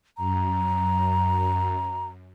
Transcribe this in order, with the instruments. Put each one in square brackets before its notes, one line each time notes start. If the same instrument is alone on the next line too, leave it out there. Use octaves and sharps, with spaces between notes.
[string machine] F#2 [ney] A#5